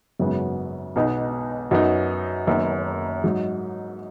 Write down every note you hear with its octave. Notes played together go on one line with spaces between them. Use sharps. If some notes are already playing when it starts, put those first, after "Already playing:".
G#1 F#2 C#3 F#3 B3
B1 B2 B3 D#4
F#2 F#3 B3 D#4
F#1 F#2 D#3 B3
G#2 F#3 D#4